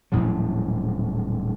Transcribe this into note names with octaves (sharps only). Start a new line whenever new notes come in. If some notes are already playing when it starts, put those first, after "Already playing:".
D#1 A2 F3 F#3